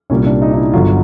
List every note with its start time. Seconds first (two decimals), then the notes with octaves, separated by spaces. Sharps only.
0.10 C2 A#2 G3 C#4
0.26 D4
0.42 D#4
0.54 D#4
0.57 E4
0.73 G1 G2 D3 F#3 F4